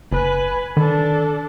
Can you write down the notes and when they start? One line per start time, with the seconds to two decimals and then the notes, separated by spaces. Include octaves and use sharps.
0.11 F#1 B4 G#5
0.77 D#3 D4 A4